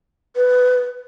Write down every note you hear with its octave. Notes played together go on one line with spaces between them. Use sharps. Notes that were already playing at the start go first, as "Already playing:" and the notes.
B4